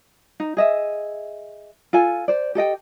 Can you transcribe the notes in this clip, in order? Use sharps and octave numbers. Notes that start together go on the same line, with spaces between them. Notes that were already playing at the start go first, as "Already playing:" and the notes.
D#4
G#4 D#5 E5
F4 A4 G#5
C5 D5
G4 A4 D#5 G5